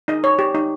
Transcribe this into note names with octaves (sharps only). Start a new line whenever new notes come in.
D#4 D#5
C#5
G4
D#4